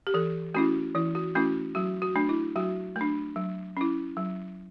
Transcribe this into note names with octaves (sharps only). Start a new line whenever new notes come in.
G4
E3 A4
A3 C#4 E4 F#4
E3 E4
F#4
A3 C#4 E4 F#4
F#3 F#4
F#4
A3 D4
E4
F#3 F#4
A3
D4
F#3
C#4 E4
F#3